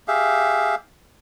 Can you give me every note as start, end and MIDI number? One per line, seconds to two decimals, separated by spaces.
0.08 0.75 67
0.08 0.75 68
0.08 0.75 76
0.08 0.75 77